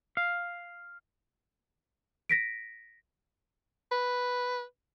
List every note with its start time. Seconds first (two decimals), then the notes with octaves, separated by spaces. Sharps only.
0.17 F5
2.29 A#6 B6 D7
3.92 B4